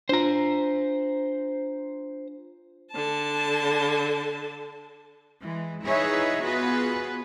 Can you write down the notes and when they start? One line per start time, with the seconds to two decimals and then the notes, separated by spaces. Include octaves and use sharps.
0.09 D4 F4 C5 A#5
2.92 D3 A5
5.42 E3 G#3
5.84 D#4 E4 G#4 B4 C#5 E5
6.44 B3 F4 F#4 G#4 B4